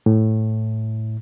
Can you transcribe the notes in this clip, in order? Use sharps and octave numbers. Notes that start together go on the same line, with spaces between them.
A2